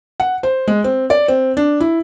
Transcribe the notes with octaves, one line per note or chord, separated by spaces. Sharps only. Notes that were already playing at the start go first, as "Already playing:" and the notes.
F#5
C5
G#3
C4
D5
C4
D4
E4